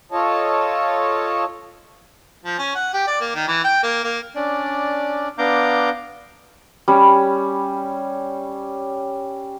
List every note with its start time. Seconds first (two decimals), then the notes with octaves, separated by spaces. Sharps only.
0.12 F4 A4 C#5 D#5 A5
2.45 F3
2.59 C#4
2.75 F#5
2.94 G4
3.08 D5
3.21 A#3
3.35 D#3
3.48 E3
3.64 G5
3.84 A#3
4.04 A#3
4.35 C#4 D4 D5
5.38 B3 D4 F5 A#5 D6 G6
6.88 G3 C#4